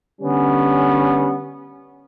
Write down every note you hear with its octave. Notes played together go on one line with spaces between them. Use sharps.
D3 G3 B3 C#4